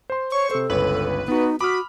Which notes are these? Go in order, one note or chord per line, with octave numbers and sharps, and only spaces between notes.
C5 C6
C#5 C#6
C3 A4 C5
G1 C#2 B4 C#5
B3 D#4 F#4
F#4 B5 D6 D#6 F6